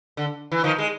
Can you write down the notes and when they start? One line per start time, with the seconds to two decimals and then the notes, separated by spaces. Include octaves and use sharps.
0.17 D3
0.52 E3
0.64 D#3 F3
0.78 G#3